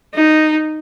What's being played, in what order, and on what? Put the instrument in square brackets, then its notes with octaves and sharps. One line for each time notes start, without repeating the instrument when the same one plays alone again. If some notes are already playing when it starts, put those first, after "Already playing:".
[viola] D#4